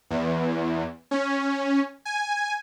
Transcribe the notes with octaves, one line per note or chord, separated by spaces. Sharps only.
E2
C#4
G#5